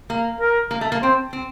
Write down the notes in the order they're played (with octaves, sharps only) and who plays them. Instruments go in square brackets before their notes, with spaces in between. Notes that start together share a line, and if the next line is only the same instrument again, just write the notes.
[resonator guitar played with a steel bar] A#3
[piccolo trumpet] A#4
[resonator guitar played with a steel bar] A#3
A3
A#3
[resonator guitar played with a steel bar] C4 [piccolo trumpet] C5
[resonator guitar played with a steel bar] C4